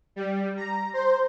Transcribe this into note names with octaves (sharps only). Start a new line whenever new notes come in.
G3
A#5
C5